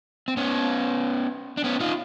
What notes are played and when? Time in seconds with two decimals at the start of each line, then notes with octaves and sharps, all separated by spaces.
0.28 C4
0.37 B3 C#4
1.57 D4
1.64 B3 C#4
1.80 D#4 F4